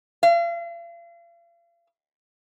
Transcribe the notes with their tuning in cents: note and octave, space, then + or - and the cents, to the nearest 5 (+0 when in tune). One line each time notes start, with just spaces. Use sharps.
F5 -40